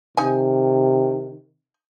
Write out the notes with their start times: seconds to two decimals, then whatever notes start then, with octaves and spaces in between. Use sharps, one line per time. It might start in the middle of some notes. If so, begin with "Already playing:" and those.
0.17 C3 D#3 D#4 G#5